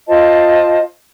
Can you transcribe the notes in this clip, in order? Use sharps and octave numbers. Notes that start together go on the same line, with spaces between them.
F4 C5 D#5 A5